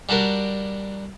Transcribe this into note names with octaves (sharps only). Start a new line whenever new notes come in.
G3 D4 F#4 G4 A#4